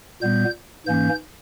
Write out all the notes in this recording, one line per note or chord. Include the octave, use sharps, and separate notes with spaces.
A#2 G3 B3 G6
G#2 E3 A#3 C#4 G6